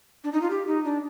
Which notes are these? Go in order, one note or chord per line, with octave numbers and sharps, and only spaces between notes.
D4
D#4
F4
G4
D#4
D4